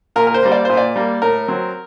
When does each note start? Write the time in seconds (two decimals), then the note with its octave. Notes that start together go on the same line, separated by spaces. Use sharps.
0.16 A#2 A#4
0.27 A#4
0.34 C5
0.43 G3 A#3
0.52 D5
0.65 A#2 C5
0.77 D5
0.96 G3 A#3
1.22 A2 A#4
1.48 F#3 C4